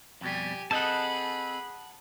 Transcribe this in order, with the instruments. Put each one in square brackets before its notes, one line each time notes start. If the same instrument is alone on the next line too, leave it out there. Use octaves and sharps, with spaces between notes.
[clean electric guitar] F2 B2 G3 [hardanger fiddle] G4 G#5
[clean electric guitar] C4 A4 D#5 [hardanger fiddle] G#4 B5 [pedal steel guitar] F#5 A5